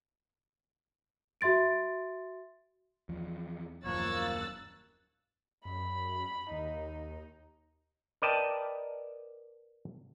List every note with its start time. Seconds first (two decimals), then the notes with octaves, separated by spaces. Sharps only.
1.41 F#4 E5 C6 A6 D7
3.09 E2 F3
3.84 D#1 F#2 F3 A#3 C#5 E6 F#6 A6
5.65 F#2 B5
6.51 D#2 D#4
8.22 A#4 B4 D5 D#5 G5 A5